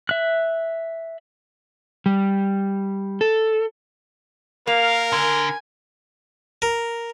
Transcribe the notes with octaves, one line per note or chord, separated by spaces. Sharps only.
E5 F#6
G3
A4
A#3 A#4 F5
D3 G#5
A#4